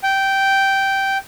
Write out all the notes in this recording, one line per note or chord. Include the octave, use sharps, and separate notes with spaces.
G5